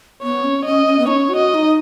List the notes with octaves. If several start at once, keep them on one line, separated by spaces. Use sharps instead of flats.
B3 C#5
C#4
C#4 D#5
C#4
B3
C#4 D#4 C#5
F#4
D#5
F#4
D#4